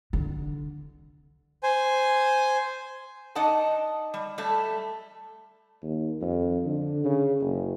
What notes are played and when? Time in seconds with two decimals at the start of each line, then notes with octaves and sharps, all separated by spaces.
0.13 D3
1.63 C5 G#5
3.35 D#4 D5 D#5 F#5 A5
4.14 G3
4.38 G3 A3 E5
5.82 D#2
6.21 F2
6.66 D3
7.05 C#3
7.41 F#1